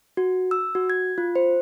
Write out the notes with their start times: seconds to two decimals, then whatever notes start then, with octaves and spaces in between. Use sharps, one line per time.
0.17 F#4
0.51 E6
0.75 F#4
0.90 G#6
1.18 F4
1.36 C5